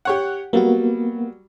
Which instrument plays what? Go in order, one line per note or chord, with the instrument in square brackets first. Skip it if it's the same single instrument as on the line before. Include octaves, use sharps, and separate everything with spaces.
[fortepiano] G4 C#5 F#5
[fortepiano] F#3 G3 [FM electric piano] A#3 B3 F#4